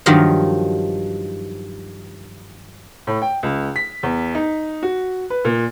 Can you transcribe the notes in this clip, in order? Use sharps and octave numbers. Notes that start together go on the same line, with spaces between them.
G2 D#3 F3 F#3 D#4 A#4
A2
G5
C#2
B6
E2
D#4
F#4
B4
A#2